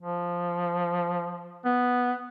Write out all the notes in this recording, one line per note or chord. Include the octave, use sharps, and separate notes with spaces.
F3
B3